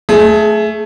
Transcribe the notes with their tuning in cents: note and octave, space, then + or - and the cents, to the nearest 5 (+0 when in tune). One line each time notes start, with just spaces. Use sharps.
A3 +0 G#4 +25